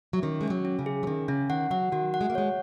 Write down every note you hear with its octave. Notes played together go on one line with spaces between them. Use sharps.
F#3
D#3 C#4
G#3 C#4
F#3
C#4
C#3
G#4
F#3
D#3 C#4
C#3 C#4
D#3 F#5
F#3 F#5
D#3 F#4
F#5
G#3
A#3
G#3 C#5